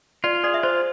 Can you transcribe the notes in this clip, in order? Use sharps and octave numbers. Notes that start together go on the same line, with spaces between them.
F4 D5
G#4 D5
E5
F4 C5